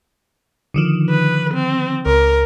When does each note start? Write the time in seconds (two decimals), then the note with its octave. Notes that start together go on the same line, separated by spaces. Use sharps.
0.74 D3 D#3 F3
1.10 B4
1.54 C4
2.06 C#2 A#4